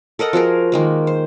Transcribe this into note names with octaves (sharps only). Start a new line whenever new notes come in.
A4 A#4 D#5 F#5
F3 F#4 G#4 A#4
D#3 G#3 A#3
C5